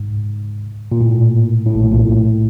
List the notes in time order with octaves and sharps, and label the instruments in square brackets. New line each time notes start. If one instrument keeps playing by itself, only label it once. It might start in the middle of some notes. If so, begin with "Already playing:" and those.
Already playing: [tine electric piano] G#2
A#2
A2
A2
A#1 A#2
B1 B2
A#1 A#2
A2